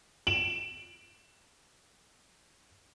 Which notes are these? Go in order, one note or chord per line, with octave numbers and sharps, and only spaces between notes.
D7 E7 F#7